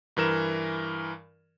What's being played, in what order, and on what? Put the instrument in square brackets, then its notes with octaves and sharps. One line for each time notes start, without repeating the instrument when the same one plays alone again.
[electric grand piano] G2 E3 A#4 E7